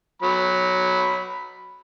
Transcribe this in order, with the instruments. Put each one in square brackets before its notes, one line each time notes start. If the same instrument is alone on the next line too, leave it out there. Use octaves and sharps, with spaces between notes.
[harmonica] F#3 B5